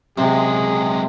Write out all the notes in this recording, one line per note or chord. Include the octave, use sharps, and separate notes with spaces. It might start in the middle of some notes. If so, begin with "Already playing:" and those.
C3 F#3 G#3 G#4